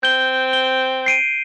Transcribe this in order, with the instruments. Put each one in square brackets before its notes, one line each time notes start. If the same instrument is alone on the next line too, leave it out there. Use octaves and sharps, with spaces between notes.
[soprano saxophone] C4 [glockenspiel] G6 G7
[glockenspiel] G7
C7 D7 D#7